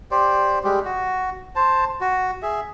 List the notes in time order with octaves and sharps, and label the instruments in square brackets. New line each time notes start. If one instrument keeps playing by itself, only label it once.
[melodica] G4 C5 D5
G3 G#3 G4
F#4
C5 A5
F#4
G#4 E5